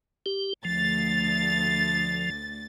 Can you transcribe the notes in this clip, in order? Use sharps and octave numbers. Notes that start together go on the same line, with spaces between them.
G4
D2 F3 A6